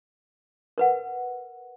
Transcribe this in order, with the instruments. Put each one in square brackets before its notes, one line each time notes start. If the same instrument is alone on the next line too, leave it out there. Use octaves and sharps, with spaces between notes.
[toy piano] A#4 B4 F#5